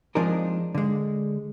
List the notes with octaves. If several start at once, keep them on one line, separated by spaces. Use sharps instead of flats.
F3 G#3 C4 D4 D#4 A#4
D3 G#3